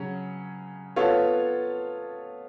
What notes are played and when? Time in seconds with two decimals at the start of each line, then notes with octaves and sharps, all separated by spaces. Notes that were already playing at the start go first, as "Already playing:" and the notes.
Already playing: C#3 F#3 C#4 G#4
0.96 B3 F4 A4 C#5 F5